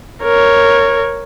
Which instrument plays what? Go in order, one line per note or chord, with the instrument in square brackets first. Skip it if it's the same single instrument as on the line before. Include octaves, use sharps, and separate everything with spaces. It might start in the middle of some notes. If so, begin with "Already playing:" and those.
[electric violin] A#4 C#5